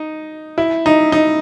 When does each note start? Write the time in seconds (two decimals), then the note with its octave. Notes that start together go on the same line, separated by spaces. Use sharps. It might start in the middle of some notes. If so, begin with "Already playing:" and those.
Already playing: D#4
0.58 E4
0.86 D#4
1.12 D#4